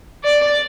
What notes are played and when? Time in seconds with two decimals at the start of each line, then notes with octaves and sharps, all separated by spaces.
0.24 D5